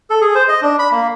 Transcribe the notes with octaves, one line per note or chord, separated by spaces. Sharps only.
A4
G#4
C5
D#5
D4
B5
A#3